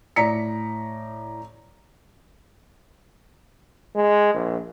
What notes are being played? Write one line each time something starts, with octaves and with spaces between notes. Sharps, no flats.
A2 D5 A#5 B6 C#7
G#3
A#1